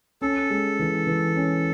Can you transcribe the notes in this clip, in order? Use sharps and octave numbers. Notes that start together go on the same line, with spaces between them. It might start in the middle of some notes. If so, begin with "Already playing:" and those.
C#4 A4
G#3
E3
E3
C#4